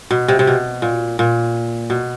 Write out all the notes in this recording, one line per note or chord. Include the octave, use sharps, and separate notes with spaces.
B2
C3
C3
B2
A#2
A#2
B2